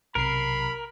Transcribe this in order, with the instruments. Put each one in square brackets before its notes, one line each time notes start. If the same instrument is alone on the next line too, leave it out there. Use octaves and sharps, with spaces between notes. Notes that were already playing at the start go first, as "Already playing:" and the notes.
[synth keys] B1 C3 C7 [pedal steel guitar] A#4 [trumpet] B5